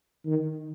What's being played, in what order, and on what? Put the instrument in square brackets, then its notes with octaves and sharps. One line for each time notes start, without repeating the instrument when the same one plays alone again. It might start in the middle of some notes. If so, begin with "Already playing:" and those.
[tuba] D#3